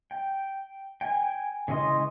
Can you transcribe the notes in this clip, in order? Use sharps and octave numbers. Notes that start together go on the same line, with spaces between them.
G5
G5 G#5
C#3 E3 G#3 D#5 C6